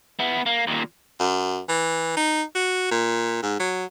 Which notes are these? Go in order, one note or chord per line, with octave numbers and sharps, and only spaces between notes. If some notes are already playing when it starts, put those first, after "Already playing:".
B3 E4
A#3
D#2 A#2
F#2
E3
D#4
F#4
A#2
G#2
F#3